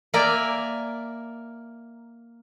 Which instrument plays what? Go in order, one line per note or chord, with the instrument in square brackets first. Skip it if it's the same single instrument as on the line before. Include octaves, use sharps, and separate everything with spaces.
[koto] A#3 A#4 D5 E5 G#5 A#5